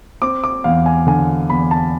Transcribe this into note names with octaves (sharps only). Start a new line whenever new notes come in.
C4 D6
D6
E2 F5
G#5
D3 G#5
E2 B5
A5